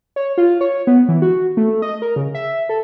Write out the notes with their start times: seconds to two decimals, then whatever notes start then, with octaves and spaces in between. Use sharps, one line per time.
0.16 C#5
0.38 F4
0.61 C#5
0.87 B3
1.09 E3
1.22 F#4
1.57 A3
1.82 D#5
2.02 A#4
2.16 C#3
2.35 E5
2.69 A4